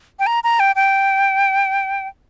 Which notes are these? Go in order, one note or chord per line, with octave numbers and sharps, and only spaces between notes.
G5
A#5
A#5
G5
G5